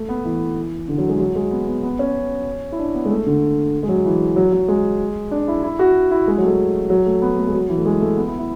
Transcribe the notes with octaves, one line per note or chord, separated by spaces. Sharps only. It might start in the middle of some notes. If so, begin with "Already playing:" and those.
Already playing: A3
B3
E3
D3
F#3
G#3
F#3
G#3
B3
B3
B3
C#4
E4
D4
B3
G#3
A3
D3
G#3
F#3
E3
F#3
F#3
G#3
D4
E4
E4
F#4
E4
G#3
F#3
A3
G#3
F#3
A3
B3
A3
G#3
F#3
E3
A3
G#3
A3
B3
E4
E4